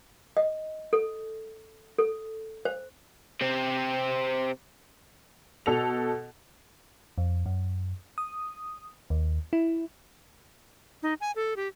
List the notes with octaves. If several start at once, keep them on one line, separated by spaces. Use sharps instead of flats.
D#5
A4
A4
C5
C3 C4
B2 A4 F7
F2
F#2
D#6
D#2
E4
D#4
G#5
A4
G4